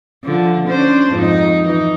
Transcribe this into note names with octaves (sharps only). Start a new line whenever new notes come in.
D3 F3
C#4 D4 C5
F2 G#2 D#4
E3 D#4